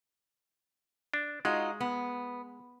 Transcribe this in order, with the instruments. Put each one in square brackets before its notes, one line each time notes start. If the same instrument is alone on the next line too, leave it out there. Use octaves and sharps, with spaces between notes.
[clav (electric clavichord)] D4
[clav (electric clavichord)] G#3 [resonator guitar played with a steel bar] D#4 F4 F#4
[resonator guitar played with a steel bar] B3